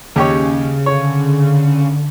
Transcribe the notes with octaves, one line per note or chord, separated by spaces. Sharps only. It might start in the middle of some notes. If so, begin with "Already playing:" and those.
D#2 C#3 G4 C#5
D3 C#5